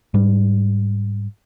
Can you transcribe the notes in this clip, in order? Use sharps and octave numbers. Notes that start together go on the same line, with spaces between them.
G#2 G3